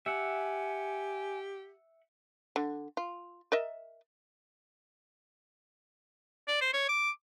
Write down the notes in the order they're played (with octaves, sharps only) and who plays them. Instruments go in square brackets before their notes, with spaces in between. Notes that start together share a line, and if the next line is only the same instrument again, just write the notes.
[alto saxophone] G4 [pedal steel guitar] E5 F#5 [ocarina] G#5
[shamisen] D3
F4
A#4 D#5 E5
[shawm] D5
C5
C#5
D6